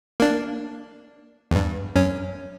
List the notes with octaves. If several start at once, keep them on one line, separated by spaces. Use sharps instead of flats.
A#3 D4
E2 G2
F#2 C#4